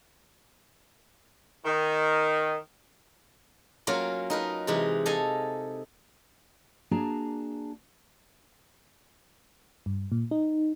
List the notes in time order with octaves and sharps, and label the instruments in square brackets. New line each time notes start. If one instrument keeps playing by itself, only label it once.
[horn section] D#3
[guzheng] F#3 A#3 C#4 F4 A#4
D#4 A#4 B4
C3 E3 G#3 D#4
A4 D#5 F5 G#5
[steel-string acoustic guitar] A#3 D4 F#4 G#4 A5 A#5
[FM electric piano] G2
A#2
D#4